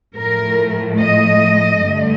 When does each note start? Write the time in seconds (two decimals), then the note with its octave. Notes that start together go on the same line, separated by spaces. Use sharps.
0.16 A2 F3 A3 A#4
1.00 D#5
1.83 G2 D3 A3